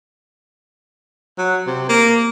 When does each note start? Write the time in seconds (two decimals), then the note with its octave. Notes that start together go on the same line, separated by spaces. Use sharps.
1.38 F#3
1.67 C3
1.89 A#3